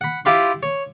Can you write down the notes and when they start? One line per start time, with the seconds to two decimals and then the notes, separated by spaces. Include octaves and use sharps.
0.01 F#5 B5
0.25 E4 F4 G4 F5 B5 C6
0.63 C#5